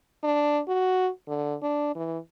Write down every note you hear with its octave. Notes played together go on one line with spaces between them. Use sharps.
D4
F#4
D3
D4
E3